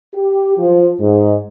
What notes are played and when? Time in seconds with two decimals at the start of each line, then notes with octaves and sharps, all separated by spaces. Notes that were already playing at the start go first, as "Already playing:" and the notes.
0.14 G4
0.58 F3
1.00 G#2